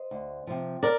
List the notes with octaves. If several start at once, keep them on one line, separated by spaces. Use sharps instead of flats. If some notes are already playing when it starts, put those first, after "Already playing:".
Already playing: C5 D#5
D2
C3 F3
A#4 D5